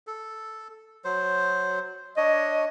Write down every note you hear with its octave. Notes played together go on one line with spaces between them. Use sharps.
A4
F#3 C5
D4 C#5 D#5